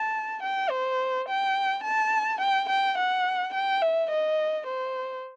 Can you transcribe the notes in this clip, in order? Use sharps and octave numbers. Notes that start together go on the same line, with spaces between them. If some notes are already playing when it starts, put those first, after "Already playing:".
Already playing: A5
G5
C5
G5
A5
G5
G5
F#5
G5
E5
D#5
C5